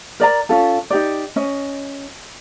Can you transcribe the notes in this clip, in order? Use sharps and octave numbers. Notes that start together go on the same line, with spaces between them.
A#4 D5 A#5
C#4 F4 A4
D#4 G4 D5
C#4 D#5